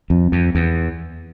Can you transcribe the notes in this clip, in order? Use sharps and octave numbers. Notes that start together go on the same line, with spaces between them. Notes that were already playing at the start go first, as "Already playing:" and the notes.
F2
F2
E2